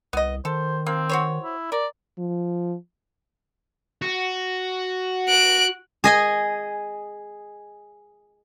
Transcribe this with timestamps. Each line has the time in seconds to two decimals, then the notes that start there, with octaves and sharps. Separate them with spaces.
0.13 C2 B3 D#5
0.45 D#3 A4 C5
0.86 A#3 C4
1.09 F#4 C5 C#5
1.43 E4
1.72 A#4 D5
2.18 F3
4.02 F#4
5.29 F#6 D7
6.04 G#4 D#5 G#5